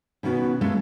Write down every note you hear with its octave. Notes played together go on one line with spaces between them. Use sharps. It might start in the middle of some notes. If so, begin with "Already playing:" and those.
B2 D#3 B3 C#4 F#4
G#3 A3 C#4 F4 A4 A#4